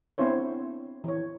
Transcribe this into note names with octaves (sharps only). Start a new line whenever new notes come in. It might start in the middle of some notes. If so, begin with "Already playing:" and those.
B3 C4 D4 E4 C5 C#5
E3 C#5